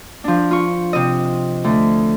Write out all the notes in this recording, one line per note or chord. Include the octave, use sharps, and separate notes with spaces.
F3 D4
F4 C#6
C3 D#5
D2